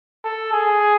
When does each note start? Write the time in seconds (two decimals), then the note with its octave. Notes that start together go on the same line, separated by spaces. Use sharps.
0.24 A4
0.52 G#4